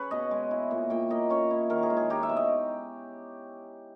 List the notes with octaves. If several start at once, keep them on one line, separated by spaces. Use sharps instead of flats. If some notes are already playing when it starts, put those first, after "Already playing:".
Already playing: C#4 G#4 B4 C#5
B2 D#5
G#3
E4
A#2
A#2 G5
A#3 D#5
C#4 C#5
E4
D#3 A#4
G#4
G#3
G#4
D#4 G4
E5
B2
D#5